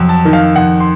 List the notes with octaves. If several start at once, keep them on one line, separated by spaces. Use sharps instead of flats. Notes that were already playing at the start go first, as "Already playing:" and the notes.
Already playing: F2 F#3
A5
D#3
F5
F2 F#5
C6